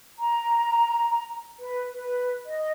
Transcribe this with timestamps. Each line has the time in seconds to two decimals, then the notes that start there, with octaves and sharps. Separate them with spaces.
0.18 A#5
1.59 B4
1.92 B4
2.46 D#5